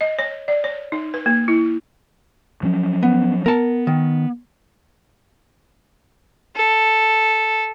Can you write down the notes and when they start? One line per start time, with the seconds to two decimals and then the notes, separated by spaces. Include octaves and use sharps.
0.01 D#5
0.19 C#5
0.48 D5
0.64 C#5
0.92 D#4
1.14 B4
1.26 A#3
1.48 E4
2.63 F3 F#3 C#4
3.03 B3
3.46 B3 A#4 A5
3.87 D#3
6.56 A4